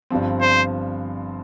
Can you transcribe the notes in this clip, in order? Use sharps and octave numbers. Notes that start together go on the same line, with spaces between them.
G1 G2 F3 C4
C5